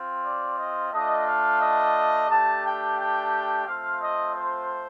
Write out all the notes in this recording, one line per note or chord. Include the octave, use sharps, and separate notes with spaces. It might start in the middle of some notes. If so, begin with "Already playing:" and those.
Already playing: C4 F4
D5
D#5
A3 D4 F4 D#5
F5
D#5
A3 D4 G4 A5
G5
G5
A3 C4 F4 F5
D#5
C5